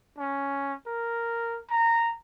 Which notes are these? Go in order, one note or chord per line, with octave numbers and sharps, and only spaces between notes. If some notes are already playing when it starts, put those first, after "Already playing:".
C#4
A#4
A#5